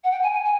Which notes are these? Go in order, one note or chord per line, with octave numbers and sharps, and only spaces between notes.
F#5
G5
G#5
G#5
G#5